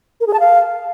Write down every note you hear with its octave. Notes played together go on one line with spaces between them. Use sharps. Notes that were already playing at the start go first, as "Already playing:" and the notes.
A#4
G#4
A5
F5